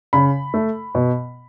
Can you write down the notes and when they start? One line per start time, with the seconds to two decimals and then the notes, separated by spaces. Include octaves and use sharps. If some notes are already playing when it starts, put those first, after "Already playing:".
0.13 C#3 B5
0.54 A3
0.95 B2